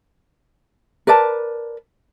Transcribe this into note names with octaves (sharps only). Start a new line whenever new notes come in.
A#4 B4 D5 A5